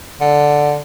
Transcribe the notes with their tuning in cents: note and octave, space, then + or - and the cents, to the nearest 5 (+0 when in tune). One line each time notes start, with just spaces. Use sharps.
D3 +0